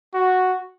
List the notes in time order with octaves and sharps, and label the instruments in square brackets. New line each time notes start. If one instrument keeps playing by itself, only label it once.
[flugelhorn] F#4